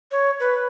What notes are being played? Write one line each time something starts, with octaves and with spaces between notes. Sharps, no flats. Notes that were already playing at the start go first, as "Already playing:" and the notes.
C#5
B4